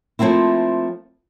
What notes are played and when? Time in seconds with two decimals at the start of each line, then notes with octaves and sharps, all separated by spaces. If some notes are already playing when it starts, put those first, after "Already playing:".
0.19 F3 A3 A#3 C4 E4